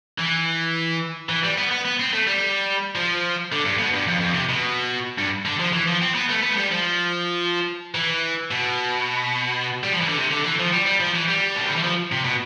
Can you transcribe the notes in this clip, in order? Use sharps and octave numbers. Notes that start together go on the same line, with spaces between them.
E3
E3
G3
B3
B3
B3
C4
A3
G3
F3
D3
G2
B2
G2
F2
F2
C3
B2
G2
D3
F3
E3
F3
C4
B3
A3
B3
A3
G3
F3
E3
B2
G3
F3
E3
D3
C3
D3
E3
F3
G3
G3
F3
E3
G3
B2
C3
D3
E3
F3
C3
B2